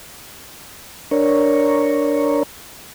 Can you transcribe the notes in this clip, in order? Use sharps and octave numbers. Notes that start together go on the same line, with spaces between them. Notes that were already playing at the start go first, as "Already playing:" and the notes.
D4 A#4 C#5